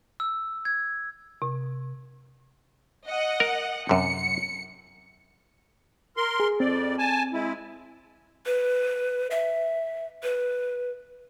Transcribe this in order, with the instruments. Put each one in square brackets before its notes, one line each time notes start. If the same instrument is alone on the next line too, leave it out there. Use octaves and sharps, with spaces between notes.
[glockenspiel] E6
G#6
[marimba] C3
[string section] D#5 F#5
[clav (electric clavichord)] A#4
[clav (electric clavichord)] F#2 C3 [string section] C#7
[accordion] A#4 C6
[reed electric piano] G#4
[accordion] F2 D5 [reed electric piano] C4
[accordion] G#5 A5
G#3 E4
[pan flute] B4
E5
B4